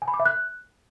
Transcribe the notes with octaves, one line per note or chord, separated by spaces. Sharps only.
G#5
B5
D6
E5
F#6